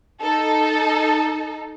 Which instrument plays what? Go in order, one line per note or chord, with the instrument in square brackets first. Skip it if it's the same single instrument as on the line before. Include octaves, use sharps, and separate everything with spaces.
[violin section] D#4 A4